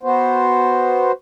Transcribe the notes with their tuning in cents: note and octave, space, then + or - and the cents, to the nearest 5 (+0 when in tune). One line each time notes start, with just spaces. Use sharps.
B3 +0 F#4 +0 C5 +0